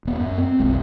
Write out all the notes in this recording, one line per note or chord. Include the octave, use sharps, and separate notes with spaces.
D#1 B3
F#2
C4
F1 B1 G#3